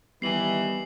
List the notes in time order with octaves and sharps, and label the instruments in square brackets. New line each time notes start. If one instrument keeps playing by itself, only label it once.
[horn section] D#3 E3 [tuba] G3 [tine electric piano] B3 G#5 [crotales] C7 F#7